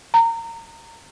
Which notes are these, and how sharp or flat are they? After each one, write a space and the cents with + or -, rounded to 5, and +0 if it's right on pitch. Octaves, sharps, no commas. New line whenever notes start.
A#5 -25